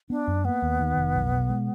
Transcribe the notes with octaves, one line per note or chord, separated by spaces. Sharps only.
B3 D4
F#2
A#3 B3
D#2
D#3
F1
B1
B2
G#3